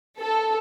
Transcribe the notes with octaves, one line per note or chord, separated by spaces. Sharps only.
A4